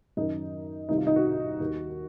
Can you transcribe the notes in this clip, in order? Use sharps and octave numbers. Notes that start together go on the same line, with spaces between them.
F#2 D#3 D#4
C2 C3 D#3 D#4
F4
D#4
F#4
D#2 D#3